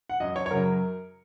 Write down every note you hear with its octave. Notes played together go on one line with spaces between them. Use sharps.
F#5
F#2 F#3 D#5
C#5
C#5
F#2 C#3 F#3 A#4